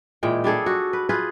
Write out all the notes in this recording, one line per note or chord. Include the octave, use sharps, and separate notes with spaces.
A#2 E3 G#3 G5
G3 D4 G#4 A4
F#4
B4
F4 G#4 B4